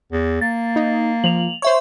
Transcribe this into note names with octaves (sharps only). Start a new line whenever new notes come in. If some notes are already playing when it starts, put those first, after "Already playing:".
E2
A#3 A6
D#4
F3 F7 F#7
C5 C#5 E5 C#6